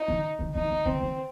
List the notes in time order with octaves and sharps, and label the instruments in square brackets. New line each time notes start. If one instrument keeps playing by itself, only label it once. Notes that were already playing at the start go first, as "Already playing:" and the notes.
Already playing: [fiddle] D#4
[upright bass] D#3
D#3
[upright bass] D#3 [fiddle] D#4
[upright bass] D#3
[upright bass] D#3 [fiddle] C4
[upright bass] D#3